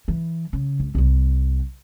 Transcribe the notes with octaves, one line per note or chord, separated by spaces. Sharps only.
E3
C#3
C#2
C2 G3